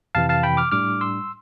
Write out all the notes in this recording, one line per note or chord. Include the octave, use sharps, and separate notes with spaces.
F2 C3 E3 F5 A5
F5 A5
G5 B5
D6 F6
A2 G3 D4 D6 F6
C6 E6